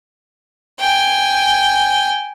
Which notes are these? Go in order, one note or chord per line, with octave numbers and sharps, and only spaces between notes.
G5 G#5